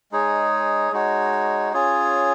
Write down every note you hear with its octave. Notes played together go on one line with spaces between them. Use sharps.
G#3 D#4 G#4 C#5
G#3 D#4 F#4 C#5
C#4 F4 G#4 C#5